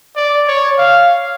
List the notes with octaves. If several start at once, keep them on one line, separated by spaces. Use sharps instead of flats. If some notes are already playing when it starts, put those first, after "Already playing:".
D5
C#5
F5